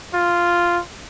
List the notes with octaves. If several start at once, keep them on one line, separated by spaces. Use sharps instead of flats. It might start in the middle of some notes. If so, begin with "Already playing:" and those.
F4